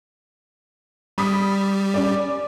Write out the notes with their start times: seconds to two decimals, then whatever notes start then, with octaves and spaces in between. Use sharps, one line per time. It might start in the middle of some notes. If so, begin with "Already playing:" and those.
1.18 G3 B5 D#6 B6
1.94 C#4 D5